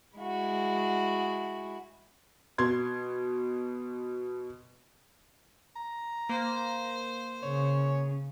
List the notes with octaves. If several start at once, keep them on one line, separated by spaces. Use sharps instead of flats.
G#3 E4 F#4
B2 C6 G#6
A#5
A#3 C5
C#3 C#5